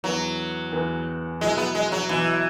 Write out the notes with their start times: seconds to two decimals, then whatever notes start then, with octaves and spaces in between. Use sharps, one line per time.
0.04 E2 E3 F#3 B3
0.72 E2 E3 B3
1.41 B2 F#3 G#3 E4
1.57 B3
1.75 G#3
1.92 F#3
2.09 B2 E3 F#3 E4